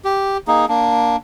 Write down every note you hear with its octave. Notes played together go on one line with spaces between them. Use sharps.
G4
A#3 D#4 G#4
A#3 D4